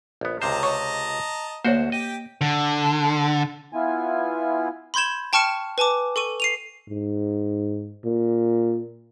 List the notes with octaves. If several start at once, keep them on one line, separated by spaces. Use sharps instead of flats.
A#1 B3
C#2 C3 C5 D#5 A5 A#5
C#5 C#6
D2 A#3 F#4 C5 C#5
G4 D#5 G5
D3
B3 E4 F4 G#5
B5 C6 G6 G#6 E7
G5 A5 C#6 F6 C#7 E7
B4 G#5 A5 D6
A4 C#6 D#7
C7 D#7 F7
G#2
A#2